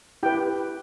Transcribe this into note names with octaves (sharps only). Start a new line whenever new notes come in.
E4 G4 B4 G5